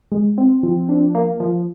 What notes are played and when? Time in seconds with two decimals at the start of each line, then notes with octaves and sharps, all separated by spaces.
0.12 G#3
0.38 C4
0.63 F3
0.89 D4
1.15 A#3
1.40 F3